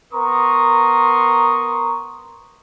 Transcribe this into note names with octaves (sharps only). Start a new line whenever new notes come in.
B3 A#4 A#5 C6 C#6 D#6